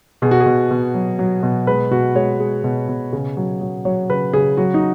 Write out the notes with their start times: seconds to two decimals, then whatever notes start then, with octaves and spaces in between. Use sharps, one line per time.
0.22 B2 G#4
0.31 F#4
0.40 G#4
0.46 B2
0.71 B2
0.94 F#3
1.19 F#3
1.43 B2
1.67 G#3 B4
1.91 B2 F#4
2.16 G#3 C#5
2.40 G#3
2.64 B2
2.88 B2
3.13 C#3
3.37 F#3
3.61 F#3
3.85 F#3 C#5
4.09 C#3 B4
4.33 C#3 G#4
4.57 F#3 F#4
4.74 D#4